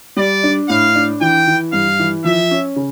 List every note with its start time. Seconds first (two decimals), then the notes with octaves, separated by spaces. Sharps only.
0.17 G3 D5
0.43 D4
0.69 A2 F5
0.96 D4
1.21 E3 G5
1.47 E3
1.73 G2 F5
1.99 E3
2.25 F3 E5
2.51 C#4
2.76 C#3